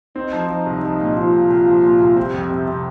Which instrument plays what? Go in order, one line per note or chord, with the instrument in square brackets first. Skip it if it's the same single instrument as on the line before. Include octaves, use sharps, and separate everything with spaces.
[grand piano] C4 [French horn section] D#4
[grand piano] F3
F3
C2
F3
A#2
[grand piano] F3 [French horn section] F4
[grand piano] A#2
C2
F3
A#2
C2
[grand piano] C4 [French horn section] G4
[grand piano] F2
C3
C3